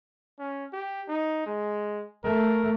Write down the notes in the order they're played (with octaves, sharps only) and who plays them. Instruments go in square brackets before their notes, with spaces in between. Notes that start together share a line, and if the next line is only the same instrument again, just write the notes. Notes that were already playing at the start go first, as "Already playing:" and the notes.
[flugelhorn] C#4
G4
D#4
G#3
[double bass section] A3 [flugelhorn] A#4